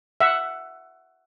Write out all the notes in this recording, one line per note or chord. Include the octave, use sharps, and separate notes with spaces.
E5 F#5